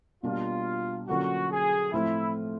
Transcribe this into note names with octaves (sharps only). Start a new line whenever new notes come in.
B2 G3 A#3 D4 F4
D3 F#3 A#3 C#4 F4 F#4
G#4
A2 F3 A3 C4 E4 F4